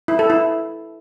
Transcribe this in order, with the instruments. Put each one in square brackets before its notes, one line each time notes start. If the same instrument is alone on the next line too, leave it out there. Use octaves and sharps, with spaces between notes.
[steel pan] E4
A4
E4